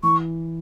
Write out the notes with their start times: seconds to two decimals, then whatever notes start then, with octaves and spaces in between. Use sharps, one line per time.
0.03 E3 C#6